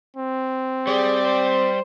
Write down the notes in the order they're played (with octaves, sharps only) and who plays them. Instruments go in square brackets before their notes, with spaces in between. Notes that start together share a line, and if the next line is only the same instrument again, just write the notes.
[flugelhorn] C4
[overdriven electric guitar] G3 G4 [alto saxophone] G#4 [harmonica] D5
[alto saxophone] C5